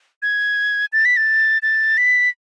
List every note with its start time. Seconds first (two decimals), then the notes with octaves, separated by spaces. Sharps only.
0.22 G#6
0.93 A6
1.05 B6
1.17 A6
1.63 A6
1.98 B6